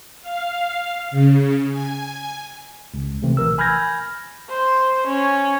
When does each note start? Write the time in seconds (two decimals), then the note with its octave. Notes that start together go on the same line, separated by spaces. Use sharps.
0.22 F5
1.11 C#3
1.72 G#5
2.94 C#2
3.22 C3 E3 A3 C4
3.37 A#1 E3 A#4 E6
3.58 G#5 B5 F6 G6 G#6 A#6
4.49 C5
5.06 C#4